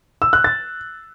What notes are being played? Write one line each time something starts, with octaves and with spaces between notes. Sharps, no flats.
E6
F#6
A6